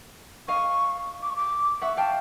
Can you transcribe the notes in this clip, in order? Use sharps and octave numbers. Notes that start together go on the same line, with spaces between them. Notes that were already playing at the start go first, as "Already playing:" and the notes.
D#5 F5 C#6
D6
C#6
D6
E5 F#5 C#6
F5 G5 A5